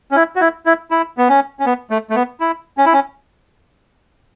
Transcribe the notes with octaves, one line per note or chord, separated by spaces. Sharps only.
C#4
E4
F#4
E4
E4
E4
B3
C#4
C#4
B3
A3
A3
B3
E4
C#4
E4
C#4